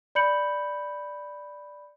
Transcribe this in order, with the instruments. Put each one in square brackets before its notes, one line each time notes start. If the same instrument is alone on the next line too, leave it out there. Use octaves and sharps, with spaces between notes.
[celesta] D5 B5 G6 C#7 F#7